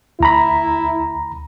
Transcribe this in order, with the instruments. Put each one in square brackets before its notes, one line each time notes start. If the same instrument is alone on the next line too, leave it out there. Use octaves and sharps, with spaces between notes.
[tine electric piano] D2 A#5 B5 [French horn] E4